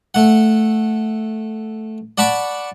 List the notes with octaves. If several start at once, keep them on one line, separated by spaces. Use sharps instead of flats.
A3 F#5
D5 F#5 A5 B5 C#6 D6